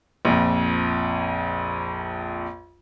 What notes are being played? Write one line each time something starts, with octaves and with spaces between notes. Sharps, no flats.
A#1 F2